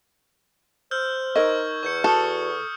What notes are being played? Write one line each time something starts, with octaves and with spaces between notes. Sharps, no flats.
C5 E6 F6 G6
D#4 A#4 D#5 C#6 E6 G#6
E2 C#6 G6 C#7
F#4 A4 C#6 D#6 F6